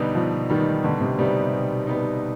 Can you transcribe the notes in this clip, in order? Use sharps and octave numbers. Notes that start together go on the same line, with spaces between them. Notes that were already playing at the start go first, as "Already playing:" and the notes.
Already playing: B2 D3 G3 B3 D#4
B2 F3
D#3 G3 B3 D#4
B2 D3
C3
C3 G3 B3 D#4
B2
G3 B3 D#4